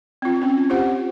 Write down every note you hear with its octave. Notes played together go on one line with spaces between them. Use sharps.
C4 F4
C4 C#4
F4 G4 C5 F#5